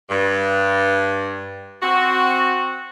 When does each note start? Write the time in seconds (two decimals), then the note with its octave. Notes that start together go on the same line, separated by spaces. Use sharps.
0.10 G2
1.83 C4 F#4